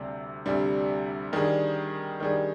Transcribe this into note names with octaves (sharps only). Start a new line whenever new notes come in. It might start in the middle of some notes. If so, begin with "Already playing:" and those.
Already playing: D2 C3 G3 D4
D2 C3 G3 D4
D#3 G3 D4 G#4
D#3 G3 D4 G#4